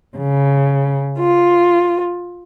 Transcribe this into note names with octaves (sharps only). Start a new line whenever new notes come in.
C#3
F4